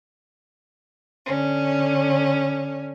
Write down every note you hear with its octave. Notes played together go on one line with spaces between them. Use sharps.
D3 C#4